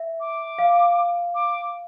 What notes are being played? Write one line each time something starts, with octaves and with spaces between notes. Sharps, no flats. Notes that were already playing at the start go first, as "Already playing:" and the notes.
Already playing: E5
D6
F5
D6